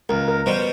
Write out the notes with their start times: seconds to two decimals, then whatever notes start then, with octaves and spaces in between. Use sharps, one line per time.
0.09 C#2 A#4
0.28 A#4
0.46 B2 G3 C5